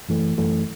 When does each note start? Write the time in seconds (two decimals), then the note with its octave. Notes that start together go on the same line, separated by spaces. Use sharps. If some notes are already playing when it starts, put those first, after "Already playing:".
0.09 F#2 E3 A3
0.38 F#2 E3 A3